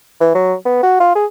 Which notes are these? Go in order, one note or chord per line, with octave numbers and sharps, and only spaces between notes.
E3
F#3
B3
F#4
F4
G#4